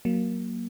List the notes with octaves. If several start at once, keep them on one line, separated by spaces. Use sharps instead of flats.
F#3 A#3